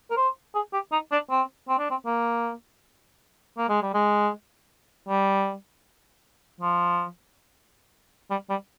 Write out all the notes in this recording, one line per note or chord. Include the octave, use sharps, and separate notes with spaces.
A#4
C5
G#4
G4
D#4
D4
C4
C4
D4
C4
A#3
A#3
G#3
G3
G#3
G3
F3
G3
G3